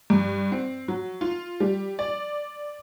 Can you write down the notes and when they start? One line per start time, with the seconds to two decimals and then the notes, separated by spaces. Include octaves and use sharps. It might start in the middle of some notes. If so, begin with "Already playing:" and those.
0.10 G2
0.52 C4
0.88 F#3
1.21 F4
1.60 G3
1.99 D5